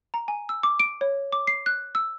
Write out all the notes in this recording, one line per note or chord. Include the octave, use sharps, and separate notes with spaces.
A#5
G#5
E6
D6
D7
C#5
D6
C7
F#6
E6